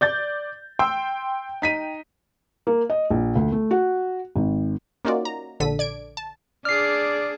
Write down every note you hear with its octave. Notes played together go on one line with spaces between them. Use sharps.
D5 G6 A6
G5 C6 E6
D#4 B6 D#7
A#3
D#5
A#1
D2
A3
F#4
G#1
A#3 C#4 D#4 F4 F#4 D5
A#5
A#1 D3 A4 B6 D#7
D5 G#6 D7
A5
D4 G#4 D5 F6 C7